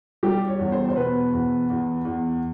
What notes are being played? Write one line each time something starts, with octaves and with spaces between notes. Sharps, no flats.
G3 G4
C#5
E2
C5
C5
B2 B4
E2
E2
E2